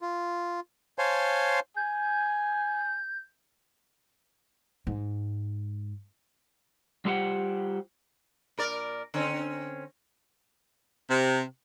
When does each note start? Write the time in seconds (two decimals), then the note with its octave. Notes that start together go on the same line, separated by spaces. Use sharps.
0.01 F4
0.98 C5 C#5 F5 G#5 A5 C6
1.76 G#5 G6
4.87 G#2
7.05 G3 F4 G4 C5 F#5 G5
8.58 A#2 A#4 D5
9.14 D3 C4 C#4
11.10 C3